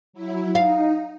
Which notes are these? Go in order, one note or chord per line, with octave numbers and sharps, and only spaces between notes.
F#3 E4
D#4 F5